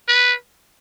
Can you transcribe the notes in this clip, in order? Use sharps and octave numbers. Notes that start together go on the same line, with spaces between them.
B4